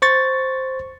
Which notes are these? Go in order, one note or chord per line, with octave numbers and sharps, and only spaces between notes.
C5 C#6 A6